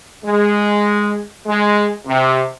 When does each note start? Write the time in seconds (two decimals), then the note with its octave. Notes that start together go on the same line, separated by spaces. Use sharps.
0.24 G#3
1.46 G#3
2.06 C3